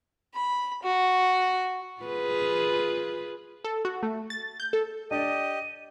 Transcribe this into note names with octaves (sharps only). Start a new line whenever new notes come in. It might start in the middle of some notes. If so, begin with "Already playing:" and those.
B5
F#4
F4 G#4 B4
A4
F#4
A3
A6
G6
A4
D4 G4 D5 D#5 D#7